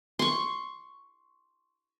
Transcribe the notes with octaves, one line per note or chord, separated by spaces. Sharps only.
C6 C#6